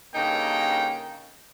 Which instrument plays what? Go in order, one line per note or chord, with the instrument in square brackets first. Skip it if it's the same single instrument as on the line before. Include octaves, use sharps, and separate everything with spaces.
[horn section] G2 C#3 A#3 D#4 A4 G5